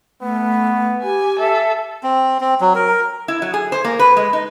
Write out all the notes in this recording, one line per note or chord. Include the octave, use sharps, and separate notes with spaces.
A3 B3
G4 G#5
A4 E5
C4
C4
F#3
A#4
E4
F#3
G#4
C5
A#3
B4
G#3
D#4